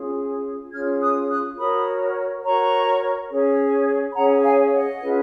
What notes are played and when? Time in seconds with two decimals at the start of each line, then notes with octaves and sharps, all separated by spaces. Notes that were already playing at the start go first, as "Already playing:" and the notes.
Already playing: C#4 F4 G#4
0.71 C#4 F4 G#4 F6 G#6
1.00 D#6 F#6
1.29 D#6 F#6
1.57 F#4 A#4 C#5 B5 D#6
2.43 F#4 A#4 C#5 A#5 C#6
3.30 C#4 G#4 C#5
4.10 B5
4.15 C#4 G#4 C#5 F#5 A#5
4.43 F5 G#5
4.73 D#5 F#5
5.00 C#4 F4 G#4 B4